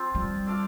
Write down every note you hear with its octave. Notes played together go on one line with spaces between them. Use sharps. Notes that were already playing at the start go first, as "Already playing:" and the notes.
Already playing: F3 C4 F4 C5
G3
D4 A4 D5 F5